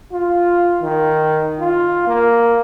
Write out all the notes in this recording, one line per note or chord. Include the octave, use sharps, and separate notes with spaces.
F4
D#3
F4
A#3